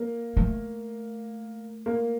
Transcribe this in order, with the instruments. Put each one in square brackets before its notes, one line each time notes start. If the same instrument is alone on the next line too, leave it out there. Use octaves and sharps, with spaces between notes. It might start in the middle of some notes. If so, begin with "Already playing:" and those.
Already playing: [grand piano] A#3
[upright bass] A3
[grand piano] A#3